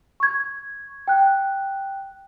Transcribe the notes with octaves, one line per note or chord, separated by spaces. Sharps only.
C#6 G#6
G5 F#6